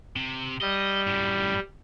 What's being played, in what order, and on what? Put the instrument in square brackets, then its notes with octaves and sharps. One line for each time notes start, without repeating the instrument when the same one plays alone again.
[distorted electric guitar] C3
[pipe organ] G3 [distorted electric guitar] D#5
[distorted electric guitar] F#2 A2